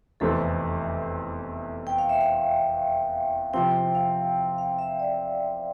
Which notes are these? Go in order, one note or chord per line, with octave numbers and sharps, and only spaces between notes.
F1 E2 E3 A3 C4 A4
G5
F5
E5
F5
C3 F3 C4 G5
F5
F5
E5
D5